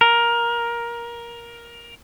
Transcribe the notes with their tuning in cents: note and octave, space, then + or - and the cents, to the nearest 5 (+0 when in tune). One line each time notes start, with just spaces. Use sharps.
A#4 +15